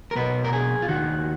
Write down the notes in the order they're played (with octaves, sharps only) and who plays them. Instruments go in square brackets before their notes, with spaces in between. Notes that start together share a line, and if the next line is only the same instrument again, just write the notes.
[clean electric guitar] A#4
B1 B2 B4
A#4
G#4
F4
D#2 D#3 F#4